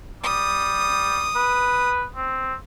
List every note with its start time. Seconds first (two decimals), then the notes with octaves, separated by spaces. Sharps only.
0.23 G3 D#6
1.35 B4
2.16 C4